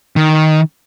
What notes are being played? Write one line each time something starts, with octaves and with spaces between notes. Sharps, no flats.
D#3